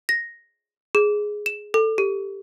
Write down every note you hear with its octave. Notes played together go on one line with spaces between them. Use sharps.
A#6
G#4
E7
A4
G4